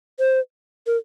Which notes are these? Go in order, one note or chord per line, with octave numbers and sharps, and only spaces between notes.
C5
A#4